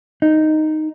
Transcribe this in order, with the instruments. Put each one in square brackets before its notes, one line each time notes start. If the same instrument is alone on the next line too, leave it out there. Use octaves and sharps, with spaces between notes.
[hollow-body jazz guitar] D#4